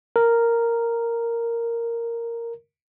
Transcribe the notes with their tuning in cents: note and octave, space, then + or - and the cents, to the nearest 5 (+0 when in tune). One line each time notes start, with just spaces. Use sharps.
A#4 -5